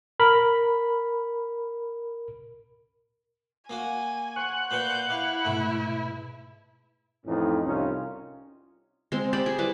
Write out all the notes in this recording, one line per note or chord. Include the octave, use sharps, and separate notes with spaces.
A#4 B5
A#3 F#4 G#5
C5 F#5 C#6
A#2 B4 G6
E4 F5 D6
G#2 B2 A3
F2 A2 E3 C#4 D#4
C2 C#4 D#4 F4
G#3 C4
G4 C5 D5 B5
G#4
G3 E4 B4 D6